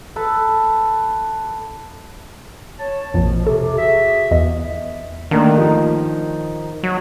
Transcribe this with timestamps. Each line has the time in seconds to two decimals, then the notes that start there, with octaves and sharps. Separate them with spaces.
0.16 A4 B4
2.79 C#5 A5
3.14 A#1 F2 B2 F3
3.47 C3 A4
3.78 F#4 G#4 E5
4.31 E2 D#5
5.31 D#3 A3 A#3 D4
5.56 F3 D#4
6.83 F#3